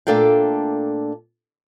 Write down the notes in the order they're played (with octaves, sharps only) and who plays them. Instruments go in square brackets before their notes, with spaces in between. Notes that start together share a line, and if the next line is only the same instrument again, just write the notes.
[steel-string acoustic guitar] A#2 A3 D4 A4 F5 G5